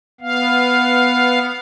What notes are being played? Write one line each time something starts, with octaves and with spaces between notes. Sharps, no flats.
B3 F5